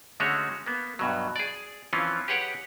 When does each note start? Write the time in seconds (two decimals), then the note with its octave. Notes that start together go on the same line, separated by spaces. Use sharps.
0.20 D3 G#3 A3 C#4 F#4 C#5
0.66 A#3 B3
0.99 G2 B2 F#3
1.36 G#4 D5
1.93 E3 F3 C4 C#4 F4
2.28 G4 G#4 B4 C#5 F#5 G5